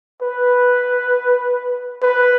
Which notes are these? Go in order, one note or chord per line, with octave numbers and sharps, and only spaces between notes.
B4
B4